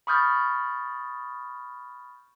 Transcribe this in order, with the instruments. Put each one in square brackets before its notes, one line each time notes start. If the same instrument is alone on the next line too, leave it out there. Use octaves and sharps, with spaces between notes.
[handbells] B5 C#6 D#6 F6 G6 A6